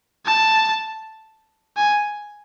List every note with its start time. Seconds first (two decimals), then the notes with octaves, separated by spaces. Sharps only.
0.25 A5
1.77 G#5